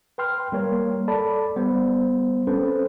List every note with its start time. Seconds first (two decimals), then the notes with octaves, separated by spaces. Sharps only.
0.18 B4 G5 C6 F6
0.52 G3 A#3 A#4 C#5
1.08 A4 D5 A5 B5
1.56 G3 B3 C5
2.47 C4 C#4 A4 B4 C5